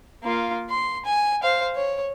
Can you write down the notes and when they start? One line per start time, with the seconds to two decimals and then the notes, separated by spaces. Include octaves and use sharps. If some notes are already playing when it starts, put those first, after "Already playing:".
0.23 A#3 F4
0.70 C6
1.05 G#5
1.43 C5 F5
1.76 C#5